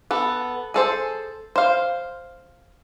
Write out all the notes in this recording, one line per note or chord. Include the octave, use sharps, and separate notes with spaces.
B3 A4
G#4 A4 C5
C5 F5